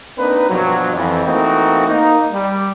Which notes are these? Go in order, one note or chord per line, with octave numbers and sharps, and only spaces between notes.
A#3 C4 D4 D#4 B4
G2 B2 F3 F#3
F2 E3
E3 A3 A#3 C4 D#4 F#4
A#3 D#4
G3